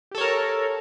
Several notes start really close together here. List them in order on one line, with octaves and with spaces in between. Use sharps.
G4 A4 C#5 A#4